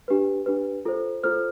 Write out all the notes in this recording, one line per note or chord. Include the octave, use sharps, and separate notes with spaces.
D4 G4 B4
D4 G4 B4
F4 A4 C5
F4 A4 C5 F6